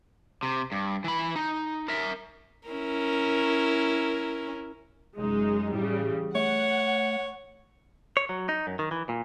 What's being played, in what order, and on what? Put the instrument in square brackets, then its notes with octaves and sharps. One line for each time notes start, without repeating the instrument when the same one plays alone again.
[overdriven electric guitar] C3
G2
E3 B5
D#4
A#4 E5
[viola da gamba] C#4 E4 A#4
[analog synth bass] F1 [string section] F#2 G#3 D#4
[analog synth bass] A2 [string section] C#3 E3 G3
[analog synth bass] A3 [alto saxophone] C#5 [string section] F#5
[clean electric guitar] C#5
F#3
D#4
F#2
D#3
E3
A#2